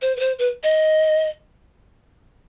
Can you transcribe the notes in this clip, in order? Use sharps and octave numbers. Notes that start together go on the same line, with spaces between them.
C5
B4
C5
B4
D#5